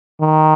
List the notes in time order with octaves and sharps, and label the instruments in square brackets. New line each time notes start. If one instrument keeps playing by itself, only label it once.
[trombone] D#3